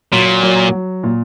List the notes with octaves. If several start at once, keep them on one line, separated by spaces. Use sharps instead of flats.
A#2 F#3
F#3
F#3
A#2